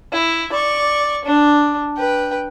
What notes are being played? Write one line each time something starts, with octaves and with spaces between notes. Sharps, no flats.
E4
D5 C#6
D4
B4 G5